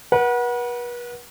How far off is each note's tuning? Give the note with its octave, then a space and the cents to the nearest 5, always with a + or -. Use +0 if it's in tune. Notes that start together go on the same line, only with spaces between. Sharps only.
B4 -40 F#5 +0